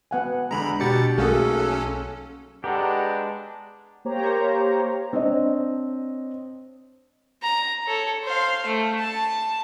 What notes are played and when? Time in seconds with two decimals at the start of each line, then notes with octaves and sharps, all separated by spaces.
0.11 B3 F#5 G#5
0.51 E2 D3 G#3 A#5 B5
0.80 B2 D4 F#4 G4 A6 C#7
1.18 B1 A3 A#3 C#4 F#4 G#4 A4 F5
2.64 G#3 B3 D4 G4 A4 F#5 A#5
4.05 A#3 G4 C5 C#5 A#5
5.13 C4 D4 C5 C#5 D#5
7.43 A#5
7.87 A4 C#5
8.23 C5 F5
8.66 A3
8.99 A5